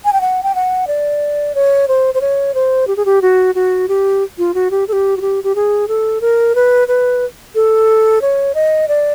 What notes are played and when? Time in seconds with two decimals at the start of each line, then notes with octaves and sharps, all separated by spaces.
0.05 G#5
0.13 G5
0.21 F#5
0.43 G5
0.55 F#5
0.87 D5
1.55 C#5
1.88 C5
2.14 C5
2.21 C#5
2.54 C5
2.87 G4
2.97 G#4
3.05 G4
3.22 F#4
3.55 F#4
3.88 G4
4.38 F4
4.54 F#4
4.71 G4
4.88 A4
4.93 G4
5.17 F#4
5.21 G4
5.44 G4
5.55 G#4
5.88 A4
6.21 A#4
6.55 B4
6.88 B4
7.55 A4
8.22 C#5
8.55 D#5
8.88 D5